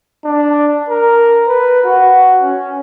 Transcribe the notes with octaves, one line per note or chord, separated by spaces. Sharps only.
D4
A#4
B4
F#4
C#4